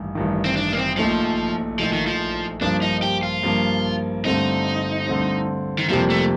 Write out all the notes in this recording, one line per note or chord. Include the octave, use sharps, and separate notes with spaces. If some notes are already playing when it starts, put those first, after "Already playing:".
Already playing: A1 G2 D#3
A1 G2 D#3
C4
D4
A#3
C4
A#1 A#2 F3 A3 D#4
A#1 A#2 F3 A3 D#4
D#3
F3
G2 F3 A#3 D4
D#4
G4
F4
G2 F3 A#3
G2 D3 A3 C4 D#4
G2 D3 A3 C4
D#3
F2 C3 F3 G3 A#3
A3